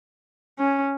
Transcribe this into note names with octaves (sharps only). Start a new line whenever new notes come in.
C#4